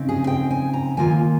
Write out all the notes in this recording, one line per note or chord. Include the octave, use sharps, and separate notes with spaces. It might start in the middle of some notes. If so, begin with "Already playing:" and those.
Already playing: C#3 C4 D#4
G#4
G5
G#5
A#5
D#3 A#3 F4 G#5